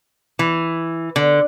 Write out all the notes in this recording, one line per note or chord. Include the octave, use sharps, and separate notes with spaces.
E3
D3